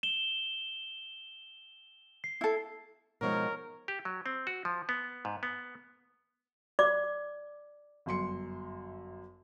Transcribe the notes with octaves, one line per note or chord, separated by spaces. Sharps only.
E7 G7
C7
E4 A4
B2 F3 G#3 D#4 A#4 C#5
G4
F#3
C4
F#4
F3
B3
G#2
B3
D5 D6
G1 F#2 C6 C#7